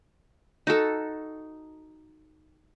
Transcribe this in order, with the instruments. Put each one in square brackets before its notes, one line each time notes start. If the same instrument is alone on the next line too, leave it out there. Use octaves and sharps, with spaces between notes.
[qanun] D#4 F#4 A4